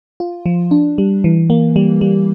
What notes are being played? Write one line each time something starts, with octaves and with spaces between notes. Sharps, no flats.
F4
F3
D4
G3
E3
A#3
G3
G3